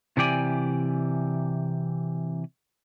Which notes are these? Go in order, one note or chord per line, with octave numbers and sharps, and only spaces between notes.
C3 E3 G4 D5 G#5